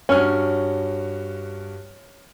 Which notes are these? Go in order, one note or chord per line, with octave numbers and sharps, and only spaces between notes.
G2 C#4 F#4 F6